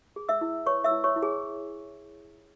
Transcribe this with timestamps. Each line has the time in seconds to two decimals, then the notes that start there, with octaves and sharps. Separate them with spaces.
0.16 G#4
0.29 E5 E6
0.41 E4
0.66 B4 C#5 C#6
0.84 E5 E6
0.91 E4
1.04 C#5 C#6
1.16 E4
1.22 G#4 G#5